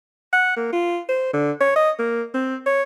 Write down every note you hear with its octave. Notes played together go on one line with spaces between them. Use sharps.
F#5
A#3
F4
C5
D3
C#5
D#5
A#3
C4
C#5